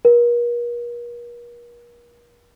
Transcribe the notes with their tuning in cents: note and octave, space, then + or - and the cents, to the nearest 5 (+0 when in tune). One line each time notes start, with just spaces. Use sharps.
A#4 +45